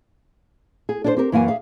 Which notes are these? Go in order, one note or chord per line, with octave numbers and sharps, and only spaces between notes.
G#4
D4 G#4 C5
C4 G4 A#4
F#2 E3 A#3 F5 F#5 G#5
G#4 E5 F5